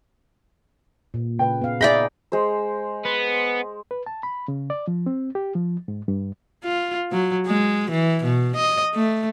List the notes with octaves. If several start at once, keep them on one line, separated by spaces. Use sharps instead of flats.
A#2
C#3 B4 G5
B3 F5
D#4 G#4 D5 E5 G5 B5 A#6
G#3 C5
B3
B4
A5
B5
C#3
D5
F3
C4
G4
F3
G#2
G2
F4
F#3
G#3
E3
B2
D#5
A3